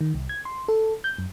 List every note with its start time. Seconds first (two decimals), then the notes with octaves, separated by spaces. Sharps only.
0.01 D#3
0.14 C2
0.29 G#6
0.45 C6
0.68 A4
1.04 G6
1.18 F#2